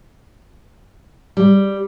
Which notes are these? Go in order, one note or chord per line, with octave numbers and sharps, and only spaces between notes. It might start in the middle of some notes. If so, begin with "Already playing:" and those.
G3